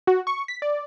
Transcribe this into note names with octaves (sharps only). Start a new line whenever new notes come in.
F#4
C#6
B6
D5